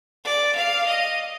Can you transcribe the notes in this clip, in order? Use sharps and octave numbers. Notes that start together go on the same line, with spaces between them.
D5
F5
D#5